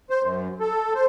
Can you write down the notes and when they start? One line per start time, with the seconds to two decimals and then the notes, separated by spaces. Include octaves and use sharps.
0.10 C5
0.23 F#2
0.60 A4
0.95 C5